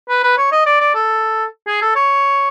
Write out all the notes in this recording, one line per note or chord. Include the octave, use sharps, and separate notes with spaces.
B4
B4
C#5
D#5
D5
D5
A4
G#4
A4
C#5